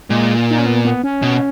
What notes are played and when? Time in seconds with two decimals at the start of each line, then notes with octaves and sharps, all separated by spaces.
0.09 A#2 G#3
0.51 D#4
0.59 C#4
0.66 B3
0.85 B3
1.04 C#4
1.22 B2